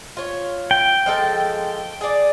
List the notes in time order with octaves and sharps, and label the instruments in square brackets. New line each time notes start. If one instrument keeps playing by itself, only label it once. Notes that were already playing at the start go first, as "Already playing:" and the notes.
[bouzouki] F4 C#5
[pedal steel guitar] G5
[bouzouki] F3 G#3 A4
G#4 D5